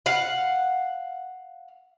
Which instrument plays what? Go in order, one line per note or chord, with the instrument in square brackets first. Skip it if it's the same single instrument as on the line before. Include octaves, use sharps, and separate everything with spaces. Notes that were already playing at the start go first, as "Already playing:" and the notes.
[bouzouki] F5 F#5